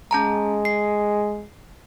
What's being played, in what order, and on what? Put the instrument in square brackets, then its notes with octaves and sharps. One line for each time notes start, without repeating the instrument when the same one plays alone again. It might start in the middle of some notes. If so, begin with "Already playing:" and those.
[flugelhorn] G#3 [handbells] C#4 A5 A#5
[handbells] C7